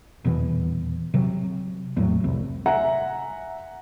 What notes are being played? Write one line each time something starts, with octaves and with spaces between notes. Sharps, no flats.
D#1 E2 B2 E3
C3 F#3
E2 A2 F#3
F1 C2
E5 F#5 G#5 A#5